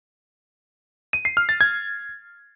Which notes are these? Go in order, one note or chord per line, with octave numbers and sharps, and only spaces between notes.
D#7
C7
F6
A6
G#6